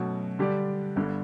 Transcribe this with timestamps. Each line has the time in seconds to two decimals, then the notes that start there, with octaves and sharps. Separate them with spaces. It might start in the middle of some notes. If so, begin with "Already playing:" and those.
Already playing: B2 F#3 A3 C#4 F#4
0.39 D3 G3 D4 G4 D5
0.96 G1 G2 D3